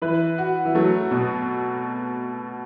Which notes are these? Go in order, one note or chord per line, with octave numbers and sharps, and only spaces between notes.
E3 B4
F#4
E3
F#3 A3
B2